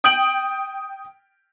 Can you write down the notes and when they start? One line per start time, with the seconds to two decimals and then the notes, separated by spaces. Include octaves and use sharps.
0.04 G5 D#6 G6 D7 F#7